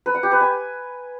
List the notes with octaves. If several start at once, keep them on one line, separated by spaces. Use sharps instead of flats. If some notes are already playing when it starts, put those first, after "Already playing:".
B4
F#5
G4
B4
G#5